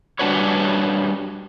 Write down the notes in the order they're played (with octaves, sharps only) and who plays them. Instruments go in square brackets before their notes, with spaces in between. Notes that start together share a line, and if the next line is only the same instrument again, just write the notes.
[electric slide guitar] G3 D4 F#4 B4 C#5